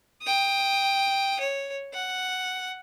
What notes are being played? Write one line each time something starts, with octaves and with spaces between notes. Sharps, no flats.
G5 D#6
C#5
F#5